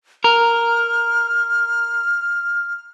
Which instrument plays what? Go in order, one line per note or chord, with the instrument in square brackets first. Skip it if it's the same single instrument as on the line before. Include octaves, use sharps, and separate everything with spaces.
[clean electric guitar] A#4 [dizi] F6